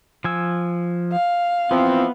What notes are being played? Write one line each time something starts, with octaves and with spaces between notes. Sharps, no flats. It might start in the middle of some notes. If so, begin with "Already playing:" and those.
F3 G#5 E6
F5
E3 F3 B3 C4